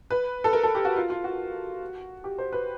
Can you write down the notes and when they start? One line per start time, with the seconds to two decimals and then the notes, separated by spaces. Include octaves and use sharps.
0.10 B4
0.44 A4
0.53 A#4
0.63 A4
0.75 G4
0.85 F#4
0.96 F4
1.10 F4
1.24 F#4
2.24 G4
2.38 C5
2.53 B4